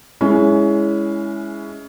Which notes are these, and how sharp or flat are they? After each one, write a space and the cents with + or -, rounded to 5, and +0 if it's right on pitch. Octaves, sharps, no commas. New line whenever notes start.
G#3 +0 C#4 +20 E4 +0